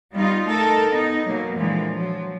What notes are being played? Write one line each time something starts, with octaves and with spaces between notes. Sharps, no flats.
G3 B3 D#4 F4
A3 D#4 A4 A#4
B3 D#4
B2 F#3 A#3
A#2 D3 E3 F3 G#3
F3 F#3